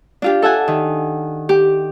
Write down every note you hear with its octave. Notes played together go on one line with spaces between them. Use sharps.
D4 F4 G4
A4 E5 F#5 G#5
D#3
G4